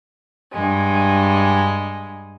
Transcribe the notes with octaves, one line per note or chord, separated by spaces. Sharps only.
G2 G#3